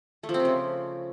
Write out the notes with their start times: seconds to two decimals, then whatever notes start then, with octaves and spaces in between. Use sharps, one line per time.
0.23 A3
0.29 F3
0.34 C4
0.40 C3
0.45 C#3